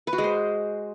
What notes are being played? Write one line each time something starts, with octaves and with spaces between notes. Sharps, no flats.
B4
F#4
G#3
C5